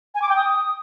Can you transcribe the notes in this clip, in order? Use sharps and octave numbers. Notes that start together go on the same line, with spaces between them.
G#5
D6
G5
D#6